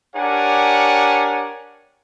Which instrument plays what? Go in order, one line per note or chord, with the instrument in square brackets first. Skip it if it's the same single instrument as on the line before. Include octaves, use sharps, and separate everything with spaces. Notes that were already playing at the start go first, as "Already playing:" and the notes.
[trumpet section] D4 G4 A#4 C#5 F#5 G#5